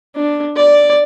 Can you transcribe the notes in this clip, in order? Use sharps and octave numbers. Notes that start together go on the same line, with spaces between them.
D4
D5